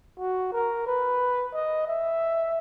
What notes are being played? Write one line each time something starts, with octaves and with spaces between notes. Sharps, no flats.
F#4
A#4
B4
D#5
E5